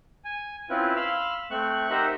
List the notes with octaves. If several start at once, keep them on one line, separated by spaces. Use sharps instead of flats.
G#5
C4 C#4 E4 F4 B4
F5 B5 C6 E6 F6
A3 C4 C#6 F#6
D#4 G4 A#4 C5 E5 F#5